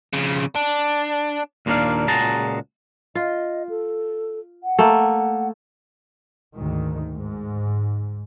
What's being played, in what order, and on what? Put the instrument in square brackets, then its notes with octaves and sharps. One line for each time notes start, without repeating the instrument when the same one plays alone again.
[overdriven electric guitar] F2 C#3
D4
[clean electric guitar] D#2 A#2 F#3 A#3 D4 F5
C#2 A#2 F#4 G#4 A5 A#5
[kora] F4 [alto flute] D#5
[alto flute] A4
F#5
[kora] A3 A#3
[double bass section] D2 G#2 D#3
G#2